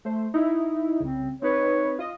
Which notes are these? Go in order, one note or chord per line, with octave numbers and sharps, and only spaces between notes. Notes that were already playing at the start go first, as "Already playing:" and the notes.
A3 C5
D#4 E4
C2 C#3 C4
C4 D#4 B4 C#5
F4 D#5